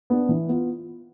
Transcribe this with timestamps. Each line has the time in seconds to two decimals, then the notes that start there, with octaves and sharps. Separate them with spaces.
0.10 B3 D4
0.29 E3
0.49 B3 F4